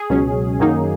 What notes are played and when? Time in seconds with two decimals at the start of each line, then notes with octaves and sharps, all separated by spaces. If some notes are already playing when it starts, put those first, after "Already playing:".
Already playing: G#4
0.10 C#2 B2 F#3 C#4
0.60 F#2 D#3 F#3 A#3 D#4